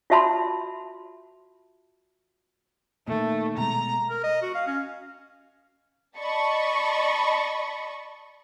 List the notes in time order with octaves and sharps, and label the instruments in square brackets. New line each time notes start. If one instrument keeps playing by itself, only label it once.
[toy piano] F4 F#4 E5 A5 B5 C6
[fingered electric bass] A#2 D#3 [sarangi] A3
[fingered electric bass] B2 G#3 [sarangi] A#5
[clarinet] A#4
D#5
F#4
F5
C#4
[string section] D5 D#5 A5 B5 C#6